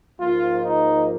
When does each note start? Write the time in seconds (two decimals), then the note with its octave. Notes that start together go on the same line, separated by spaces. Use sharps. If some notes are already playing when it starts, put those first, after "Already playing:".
0.18 G#2 F3 A#3 F4
0.62 D#4